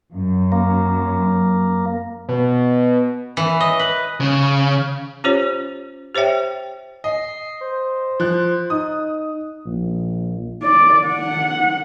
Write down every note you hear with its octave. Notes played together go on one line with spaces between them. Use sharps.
F#2
A#3
B2
E3
D#5
B4
C#3
C#4 F4 G4 C5 C#5
G4 C5 C#5 E5 G5
D#5 C7
C5
F3 F#6
D#4 D#6
A#1
D5
F#5